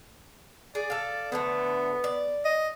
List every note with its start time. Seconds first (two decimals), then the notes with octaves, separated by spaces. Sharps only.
0.75 G#4 D5
0.90 A4 F5
1.32 D3 F3 A3 B3
2.04 D5
2.44 D#5